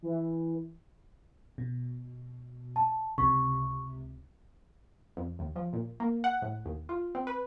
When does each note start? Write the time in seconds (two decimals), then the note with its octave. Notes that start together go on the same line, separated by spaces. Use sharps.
0.02 E3
1.58 B2
2.76 A5
3.18 C#2 C3 C#6
5.17 F2
5.39 D#2
5.56 F3
5.73 A#2
6.00 A#3
6.24 F#5
6.42 A2
6.65 D#2
6.89 F4
7.15 C4
7.27 B4